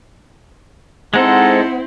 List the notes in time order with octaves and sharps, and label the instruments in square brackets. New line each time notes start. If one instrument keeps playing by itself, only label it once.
[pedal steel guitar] G#3 D#4 A4 [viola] C4 E4 [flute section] C5 F#5